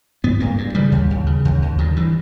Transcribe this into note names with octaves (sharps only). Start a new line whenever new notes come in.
G2 B3
G2 A#3
G2
C#3 G3
D#2
D#2
C#3
D#2
D#2
G2 D#3
G2 E3